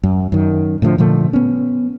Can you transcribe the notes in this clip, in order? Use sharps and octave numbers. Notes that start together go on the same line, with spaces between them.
F#2
F#2 D#3
A2 D3 D#3 F3
A#2 D3 F3 A3
B3 C#4